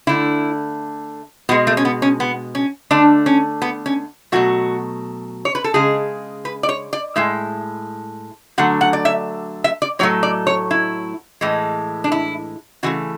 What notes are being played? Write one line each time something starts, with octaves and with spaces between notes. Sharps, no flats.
D3 A3 E4
B2 G#3 B3
A3
C#4
B3
C#4
B3
C#4
D3 A3 D4
C#4
B3
C#4
B2 F#3 A3 F#4
C#5
B4
A4
C#3 G#3 G#4
B4
D5
C#5
D5
A2 G#3 E5
D3 F#3 A3 F#5
F#5
D5
E5
E5
D5
A2 F#3 A3 C#5
D5
C#5
E4
A2 E3 G#3
D4
E4
C#3 E3 A3 F#4